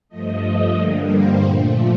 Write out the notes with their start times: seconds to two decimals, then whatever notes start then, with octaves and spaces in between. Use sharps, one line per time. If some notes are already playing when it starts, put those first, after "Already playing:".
0.09 G2 F3 A3 D#5
0.75 G2 D3 G3 A#3 D5
1.07 C5
1.41 A#2 F3 A3 A#4